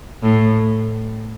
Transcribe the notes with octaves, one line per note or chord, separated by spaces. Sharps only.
A2